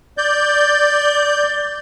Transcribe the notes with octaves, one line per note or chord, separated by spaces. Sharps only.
D5 G6